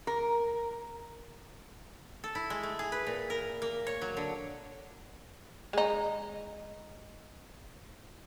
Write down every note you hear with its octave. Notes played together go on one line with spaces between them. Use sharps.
A#4
A4
E4
G#3
A3
G#4
B4
A#2
A#4
A#3
C#5
F#3
D3
G#3 D#4